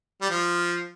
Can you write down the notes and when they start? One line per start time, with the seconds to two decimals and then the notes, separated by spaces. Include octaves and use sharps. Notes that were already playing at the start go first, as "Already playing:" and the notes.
0.21 G3
0.30 F3